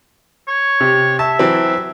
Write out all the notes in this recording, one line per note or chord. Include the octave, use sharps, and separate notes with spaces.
C#5
C3
E5 A5
E3 F#3 C4